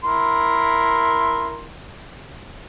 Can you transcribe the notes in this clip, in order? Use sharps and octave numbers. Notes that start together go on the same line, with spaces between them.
E4 A#4 C6